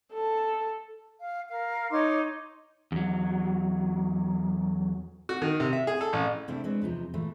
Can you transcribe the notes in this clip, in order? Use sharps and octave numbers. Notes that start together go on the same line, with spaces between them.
A4
F5
A#4 F5
D#4 C#5 C6 D6
E2 F#3
F#4
D#3
C3
E5
G#4
A4
A1
C3 A3 C4 D4 E4
G#3 C4 D4 B4 C#5
E2 C3 F3 D#4
E2 A#2 E3 A3